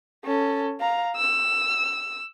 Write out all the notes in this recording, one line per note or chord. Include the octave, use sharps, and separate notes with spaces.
C#4 A4
F5 A#5
E6